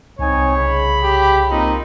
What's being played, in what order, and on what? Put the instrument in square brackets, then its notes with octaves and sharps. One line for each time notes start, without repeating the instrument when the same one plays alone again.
[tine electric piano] C2 [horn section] C4 D#4 G#5 [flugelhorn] C#5
[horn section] C#3 [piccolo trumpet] B5
[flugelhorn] G4
[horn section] A#3 C4 F4 [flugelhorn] D#4